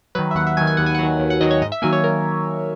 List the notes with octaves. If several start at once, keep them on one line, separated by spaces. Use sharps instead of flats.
D#3 F#3 B4
E5
D#2 F#5
E5
D#3 F#3 G#5
G#5
D#2 F#5
G#5
F#5
D#3 F#3
D#2
F#5
D#3 F#3 D#5
C#5
G#2 D#5
E5
D#3 F#3 A#3 G#5
C#5
A#4